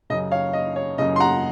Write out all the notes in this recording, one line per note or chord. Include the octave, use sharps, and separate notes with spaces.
F#2 C#3 D#5
C#5 F5
D#5
C#5
F#2 C#3 D#5
C6
F#5 A#5